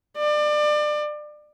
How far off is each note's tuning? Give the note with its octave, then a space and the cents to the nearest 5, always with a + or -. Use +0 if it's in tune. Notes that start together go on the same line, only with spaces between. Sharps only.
D5 +30